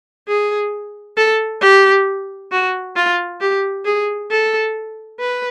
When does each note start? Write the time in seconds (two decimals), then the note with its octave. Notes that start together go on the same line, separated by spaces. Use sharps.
0.28 G#4
1.17 A4
1.61 G4
2.52 F#4
2.96 F4
3.41 G4
3.85 G#4
4.31 A4
5.19 B4